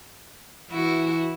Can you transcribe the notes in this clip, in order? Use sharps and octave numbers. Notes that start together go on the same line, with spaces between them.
E3 E4 F#4